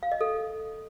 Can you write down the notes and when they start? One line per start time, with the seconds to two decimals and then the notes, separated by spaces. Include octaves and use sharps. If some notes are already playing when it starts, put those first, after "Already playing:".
0.03 F5
0.12 D#5
0.21 A4